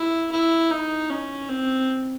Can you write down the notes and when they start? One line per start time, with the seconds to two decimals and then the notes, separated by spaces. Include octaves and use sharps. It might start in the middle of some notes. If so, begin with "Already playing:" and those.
Already playing: E4
0.32 E4
0.71 D#4
1.10 C#4
1.49 C4